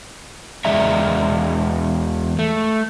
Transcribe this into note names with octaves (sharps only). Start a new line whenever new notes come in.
E2 G#3 D5 E5 A#5
A3